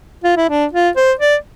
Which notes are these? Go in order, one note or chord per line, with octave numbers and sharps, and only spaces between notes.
F4
E4
D4
F4
C5
D5